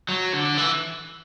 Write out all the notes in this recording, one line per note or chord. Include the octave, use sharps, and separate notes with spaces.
F#3
D3
E3